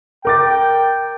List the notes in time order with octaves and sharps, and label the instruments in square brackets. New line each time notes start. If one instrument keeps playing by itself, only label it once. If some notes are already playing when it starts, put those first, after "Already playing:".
[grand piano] A#4 D6 A6 [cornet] G5